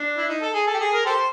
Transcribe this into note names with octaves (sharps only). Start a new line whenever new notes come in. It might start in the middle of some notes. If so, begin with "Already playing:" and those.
Already playing: D4
E4
D#4
A4
G#4
A4
G4
G#4
A#4
G4 A4 C5